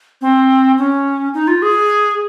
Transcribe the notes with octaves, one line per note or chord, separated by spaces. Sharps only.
C4
C#4
D#4
F4
G#4